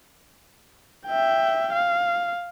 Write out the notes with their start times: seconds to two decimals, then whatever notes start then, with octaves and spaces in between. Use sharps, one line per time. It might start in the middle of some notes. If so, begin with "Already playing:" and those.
1.07 E5 G5
1.73 F5